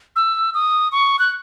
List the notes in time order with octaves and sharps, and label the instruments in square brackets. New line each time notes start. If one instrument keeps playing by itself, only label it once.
[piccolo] E6
D#6
C#6
F#6